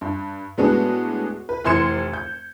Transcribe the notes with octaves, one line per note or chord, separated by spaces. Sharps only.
G2
A2 G#3 B3 D4 F#4 G#4
B4
F1 E3 C6 G#6 C#7 E7
G6